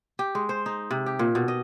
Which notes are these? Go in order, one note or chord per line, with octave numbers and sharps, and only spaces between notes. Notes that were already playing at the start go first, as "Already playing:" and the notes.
G4
G#3
C5
D#4
C3
G4
A#2
B2
D#5